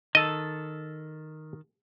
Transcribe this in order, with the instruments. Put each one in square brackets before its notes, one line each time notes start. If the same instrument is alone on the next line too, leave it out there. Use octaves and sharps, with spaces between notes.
[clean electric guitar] D#3 A4 [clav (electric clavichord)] D#5